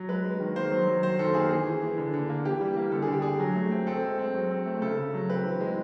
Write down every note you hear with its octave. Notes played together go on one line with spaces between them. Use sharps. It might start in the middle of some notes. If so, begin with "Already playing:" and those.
Already playing: F#3
G#3 B4
G#3
D#3
A#3 C5
F#3
F#3
D#3 C5
D#3 A4
A#3 G#4
E3 G#4
E3
E3
D3
D3
A#3
E3 G4
G3
A#3
D3 A4
G#4
D3 G4
D3 G#4
F#3
A3
C4
C4 A4
G#3
C4
F#3
C4
A3
C#3 A4
C#3
F#3
C4 B4
E3
G#3